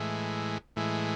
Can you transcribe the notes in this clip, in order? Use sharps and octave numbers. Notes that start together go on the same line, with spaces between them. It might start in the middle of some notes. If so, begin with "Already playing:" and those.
Already playing: A2 E3 G#3
A2 E3 G#3